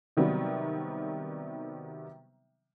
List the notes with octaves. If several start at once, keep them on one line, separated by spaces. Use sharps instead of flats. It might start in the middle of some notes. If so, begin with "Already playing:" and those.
C3 D#3 F#3 G3 B3